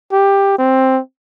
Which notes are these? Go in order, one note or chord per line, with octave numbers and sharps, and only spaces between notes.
G4
C4